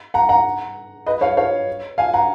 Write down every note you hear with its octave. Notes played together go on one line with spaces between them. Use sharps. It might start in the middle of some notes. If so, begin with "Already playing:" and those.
F#5 A#5
F#5 A#5
B4 D#5
C#5 F5
C#5 F5
F5 G#5
F#5 A#5